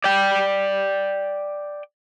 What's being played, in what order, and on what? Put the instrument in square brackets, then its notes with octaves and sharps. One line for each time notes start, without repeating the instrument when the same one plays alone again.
[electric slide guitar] D5 G5